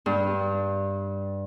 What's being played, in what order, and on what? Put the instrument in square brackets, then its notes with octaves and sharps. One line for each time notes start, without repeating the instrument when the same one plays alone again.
[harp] G2